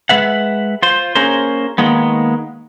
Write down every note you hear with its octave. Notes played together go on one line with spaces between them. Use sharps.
G#3 B4 E5 F#5
F4 C5
A#3 C#4 G#4 A#4 C5
D#3 G#3 A#3 B3